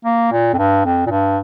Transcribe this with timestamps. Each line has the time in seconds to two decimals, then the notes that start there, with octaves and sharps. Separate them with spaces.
0.05 A#3
0.32 A#2
0.54 F2
0.58 G2
0.85 F2
1.07 A#2
1.11 G2